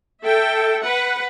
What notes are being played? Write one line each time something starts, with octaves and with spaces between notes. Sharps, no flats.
A4 E5 G5
B4 F#5